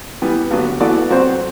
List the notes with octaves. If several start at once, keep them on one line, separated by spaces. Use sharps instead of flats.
E3 G3 B3
G2 D3 F#3 B3 D4
E3 B3 F#4 A4 D5
F#3 C4 F#4 C5